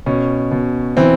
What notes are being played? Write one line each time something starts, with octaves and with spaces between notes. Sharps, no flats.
B2 C#4
B2
E3 C4